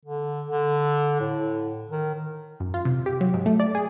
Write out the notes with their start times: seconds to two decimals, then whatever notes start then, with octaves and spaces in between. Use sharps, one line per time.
0.05 D3
0.50 D3
1.20 A2
1.91 D#3
2.60 F#2
2.74 F4
2.85 C3
3.06 G4
3.21 F#3
3.34 G#2
3.46 A3
3.60 D5
3.75 G#4